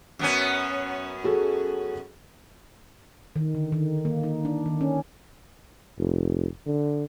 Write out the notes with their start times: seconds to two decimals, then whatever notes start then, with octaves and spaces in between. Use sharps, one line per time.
0.19 F#2 B3 C#4
1.24 F#4 G#4 A4
3.36 D#3
3.55 D3
3.72 D#3
4.05 A#3
4.23 D#4
4.45 D4
4.66 D#3
4.81 C#4
5.98 F1
6.67 D3